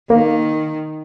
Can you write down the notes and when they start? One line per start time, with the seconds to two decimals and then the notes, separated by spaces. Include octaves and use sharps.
0.10 D#3 A#3